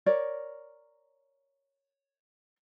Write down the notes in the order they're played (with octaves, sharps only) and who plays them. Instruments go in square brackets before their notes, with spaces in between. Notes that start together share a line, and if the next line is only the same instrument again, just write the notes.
[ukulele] A#4 C#5 D5